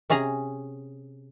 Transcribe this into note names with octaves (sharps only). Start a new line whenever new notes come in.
C3 C#4 G#4 A#5